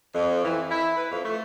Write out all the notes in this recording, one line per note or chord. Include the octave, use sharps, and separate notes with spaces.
F2
E3
E4
B4
F2
A3